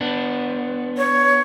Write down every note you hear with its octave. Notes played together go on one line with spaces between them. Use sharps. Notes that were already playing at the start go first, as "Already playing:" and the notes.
B3 D4
C#5